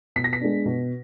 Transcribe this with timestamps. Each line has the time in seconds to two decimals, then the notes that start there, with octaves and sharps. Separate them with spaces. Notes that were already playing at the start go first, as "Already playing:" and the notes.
0.16 B2 B6
0.24 A#6
0.33 B6
0.41 G#3 B3 D4
0.66 B2